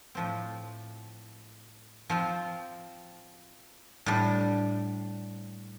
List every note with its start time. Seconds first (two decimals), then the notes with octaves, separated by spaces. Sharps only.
0.15 A2 F3 C4
2.10 F3 C4 F4
4.06 A2 G3 D4